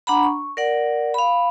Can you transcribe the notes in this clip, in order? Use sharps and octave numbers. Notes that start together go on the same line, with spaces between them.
D4 F#5 A#5 B5
C#6
A#4 D5 F#5
F5 B5